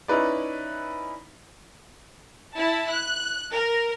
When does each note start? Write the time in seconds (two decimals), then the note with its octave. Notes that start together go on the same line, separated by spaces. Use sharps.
0.08 C#4 D#4 E4 B4 D5
2.57 E4 A5
2.91 F#6
3.51 A#4